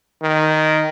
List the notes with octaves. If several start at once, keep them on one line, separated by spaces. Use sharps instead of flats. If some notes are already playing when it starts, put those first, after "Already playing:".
D#3